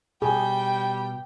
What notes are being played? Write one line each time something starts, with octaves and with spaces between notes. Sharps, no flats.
B2 G3 G#4 G5